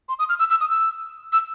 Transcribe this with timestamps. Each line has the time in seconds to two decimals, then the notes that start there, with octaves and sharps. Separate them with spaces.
0.09 C6
0.19 D#6
0.29 F6
0.39 E6
0.50 E6
0.61 D#6
0.71 E6
1.33 E6